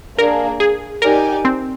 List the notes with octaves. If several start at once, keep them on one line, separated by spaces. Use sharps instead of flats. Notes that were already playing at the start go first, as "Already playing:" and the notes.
A#3 D4 G#4 A#4
G#4
D#4 G4 A#4 D5 G#5
C4